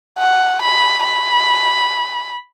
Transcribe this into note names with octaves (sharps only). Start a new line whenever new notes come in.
F#5
B5
B5